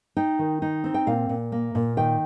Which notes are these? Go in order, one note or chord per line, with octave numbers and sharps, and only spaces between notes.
D#4 G5
D#3
D#4
C4
G5
A#2 F5
A#2
A#3
A#2
D#3 G5